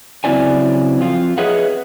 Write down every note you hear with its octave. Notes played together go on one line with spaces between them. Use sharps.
C#3 F#3 C4 E4 D5 G#5
F2 F4
G#4 B4 C#5 D#5 E5 F#5